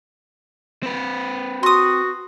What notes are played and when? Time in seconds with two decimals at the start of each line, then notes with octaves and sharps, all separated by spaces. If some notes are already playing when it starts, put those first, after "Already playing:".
0.83 C4 B4
1.63 F#4 C6 D#6